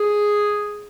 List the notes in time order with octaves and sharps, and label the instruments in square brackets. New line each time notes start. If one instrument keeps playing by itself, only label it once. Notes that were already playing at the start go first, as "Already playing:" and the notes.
Already playing: [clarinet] G#4